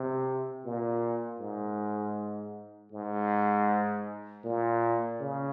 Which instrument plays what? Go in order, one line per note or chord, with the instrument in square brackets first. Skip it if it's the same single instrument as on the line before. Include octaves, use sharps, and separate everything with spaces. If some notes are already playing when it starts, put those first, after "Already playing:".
Already playing: [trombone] C3
A#2
G#2
G#2
A#2
C#3